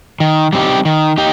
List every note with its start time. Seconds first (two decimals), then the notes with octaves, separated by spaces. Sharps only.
0.20 D#3
0.53 G3 C4 D#4 G4
0.85 D#3
1.18 D#4 G4